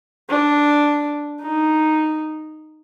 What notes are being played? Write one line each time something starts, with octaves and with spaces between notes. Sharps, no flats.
D4
D#4